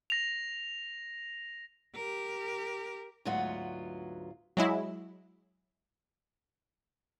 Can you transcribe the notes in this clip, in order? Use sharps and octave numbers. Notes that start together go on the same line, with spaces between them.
A#6 F7
G4 A#4
D2 G#2 F#3 B3 F4 F#5
F#3 G#3 E4